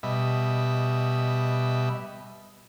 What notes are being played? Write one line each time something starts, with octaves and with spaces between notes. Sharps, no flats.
B2 G3 D#5 E5 B5